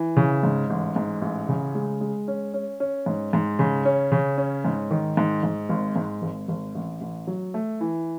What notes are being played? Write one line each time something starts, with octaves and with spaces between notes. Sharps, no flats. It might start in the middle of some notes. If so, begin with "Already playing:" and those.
Already playing: E3
C#3
G#2
A1
G#2
A1
C#3
G#3
G#3
C#4
C#4
C#4
G#2
G#2
C#3
C#4
C#3
C#4
G#2
D#3
G#2
G#2
G#1
G#2
G#1
G#1
A1
A1
F#3
A3
E3